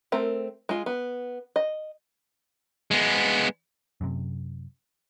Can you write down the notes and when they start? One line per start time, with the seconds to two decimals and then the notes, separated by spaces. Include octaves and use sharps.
0.12 A3 C4 A#4
0.69 G#3 F4
0.86 B3
1.56 D#5
2.91 G#3 B3
4.01 F#2 C3